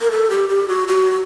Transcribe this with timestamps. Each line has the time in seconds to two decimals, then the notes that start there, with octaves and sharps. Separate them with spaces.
0.01 A#4
0.11 A4
0.30 G4
0.49 G4
0.68 F#4
0.88 F#4